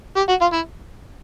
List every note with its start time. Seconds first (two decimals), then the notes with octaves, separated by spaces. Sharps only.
0.17 G4
0.29 F#4
0.41 F4
0.53 E4